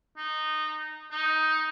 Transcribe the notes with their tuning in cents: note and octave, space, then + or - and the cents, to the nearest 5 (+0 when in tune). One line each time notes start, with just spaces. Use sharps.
D#4 -15
D#4 +10